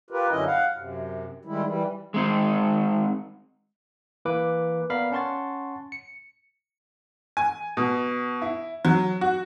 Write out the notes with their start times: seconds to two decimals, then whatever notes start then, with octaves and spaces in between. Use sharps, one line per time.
0.11 F4 G4 A#4 B4
0.30 F#2 D3 F#3 C#4 E4 D#5
0.46 F5 F#5
0.75 F#2 C3
1.45 D#3 G3 G#3 E4
1.65 E3 G3
2.14 G#3 C4 D#4
4.25 E3 A#3 B4 D6
4.90 B3 A#4 D5 F5 A#5 B5
5.12 C#4 F#5 A5 C6 C#6 A6
5.92 C#7
7.37 G#5
7.77 B2
8.42 E4
8.85 F#3
9.21 F#4